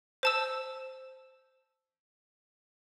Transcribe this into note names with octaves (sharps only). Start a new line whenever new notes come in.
C5 A5 E6